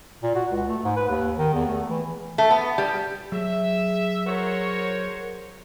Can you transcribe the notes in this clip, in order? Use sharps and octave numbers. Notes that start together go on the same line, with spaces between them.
A#2
F#4
C#2
A3
G#2
B4
D#2
D#3
E2
A3
E3
A3
B3
G3
F#3 G#4 E5
F#4 A#4 C5 C#5